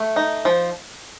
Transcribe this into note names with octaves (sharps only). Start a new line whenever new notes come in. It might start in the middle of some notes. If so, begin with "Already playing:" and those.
Already playing: A3
D#4
F3